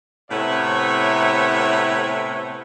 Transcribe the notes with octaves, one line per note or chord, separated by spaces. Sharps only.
A2 C3 B3 C#5 E5